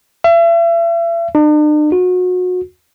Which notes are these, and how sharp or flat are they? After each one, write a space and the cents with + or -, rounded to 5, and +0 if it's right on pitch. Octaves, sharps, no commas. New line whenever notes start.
E5 +40
D4 +45
F#4 -30